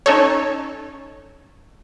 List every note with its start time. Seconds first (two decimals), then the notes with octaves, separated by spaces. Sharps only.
0.06 C#4 D#4 A4 C#5